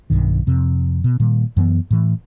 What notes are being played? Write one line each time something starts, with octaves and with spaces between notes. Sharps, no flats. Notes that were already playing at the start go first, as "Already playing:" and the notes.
B1 G2 D#3
F2 C3
B2
A#2 D#3 G3
F#2 E3 G#3 B3
A2 E3